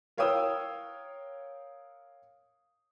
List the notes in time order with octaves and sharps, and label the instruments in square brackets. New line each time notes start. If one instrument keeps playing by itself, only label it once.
[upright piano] A#4 C#5 F5 G5 D#6 E6